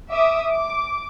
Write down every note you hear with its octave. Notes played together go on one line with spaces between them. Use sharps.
E5 D6 D#6
D6